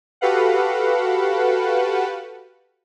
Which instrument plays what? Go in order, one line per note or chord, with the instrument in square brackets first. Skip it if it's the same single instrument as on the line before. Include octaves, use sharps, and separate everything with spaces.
[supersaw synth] F#4 G4 A4 B4 F5 F#5